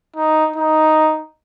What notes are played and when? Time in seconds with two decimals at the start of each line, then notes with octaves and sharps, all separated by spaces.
0.16 D#4
0.56 D#4